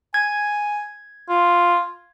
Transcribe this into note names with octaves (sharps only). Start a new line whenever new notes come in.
G#5 G#6
F4